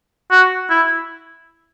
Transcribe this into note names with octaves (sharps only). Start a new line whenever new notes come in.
F#4
E4